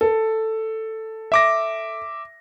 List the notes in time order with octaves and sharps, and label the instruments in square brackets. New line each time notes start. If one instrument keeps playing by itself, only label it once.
[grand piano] A4
[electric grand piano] E5 D6 A#6